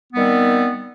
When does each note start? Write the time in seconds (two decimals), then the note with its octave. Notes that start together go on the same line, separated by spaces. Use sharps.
0.11 B3
0.14 G3
0.17 D#3
0.20 C4